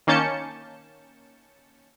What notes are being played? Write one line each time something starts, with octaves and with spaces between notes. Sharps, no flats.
D#3 A#3 C#4 A5 G6 C#7